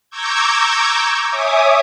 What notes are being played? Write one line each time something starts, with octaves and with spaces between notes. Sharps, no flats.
A#5 C#6 D6 E6 G6 G#6
C#5 E5 G#5 D6 D#6